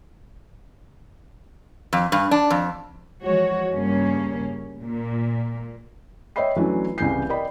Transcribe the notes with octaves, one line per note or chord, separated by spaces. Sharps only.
F2
G2
D4
F2
E3 F3 G#3 F#4 C#5
G2 C#3 A#3 C#4
A#2 A#3
C#5 D#5 E5 G5 B5 C7
E3 F#3 A3 C#4 D4 E4
C2 C#3 E3 G#5 G6 C7
A#4 D5 D#5 G5 B5